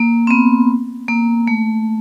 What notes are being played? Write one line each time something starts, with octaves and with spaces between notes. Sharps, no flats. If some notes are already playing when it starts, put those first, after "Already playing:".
Already playing: A#3
C4
B3
A#3
A3